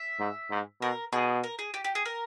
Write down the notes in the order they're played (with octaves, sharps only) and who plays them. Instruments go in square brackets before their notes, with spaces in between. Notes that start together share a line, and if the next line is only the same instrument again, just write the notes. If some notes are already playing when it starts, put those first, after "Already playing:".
Already playing: [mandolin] E5
[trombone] G#2
G#2
[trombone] B2 [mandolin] A#4
[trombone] B2 [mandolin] G#4
[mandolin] A#4
G#4
G4
G4
G#4
A#4